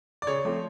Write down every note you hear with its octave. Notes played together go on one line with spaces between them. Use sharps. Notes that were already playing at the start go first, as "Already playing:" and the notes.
D5
C#3 C#5
F3 A3 C4